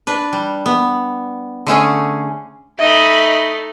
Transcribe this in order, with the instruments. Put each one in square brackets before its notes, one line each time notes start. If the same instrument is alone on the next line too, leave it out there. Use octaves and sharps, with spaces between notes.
[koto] D4 B4
G3
B3
D3 A3 C#4 G#4
[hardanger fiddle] A3 D#4 [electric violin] D#5 B5 [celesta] E5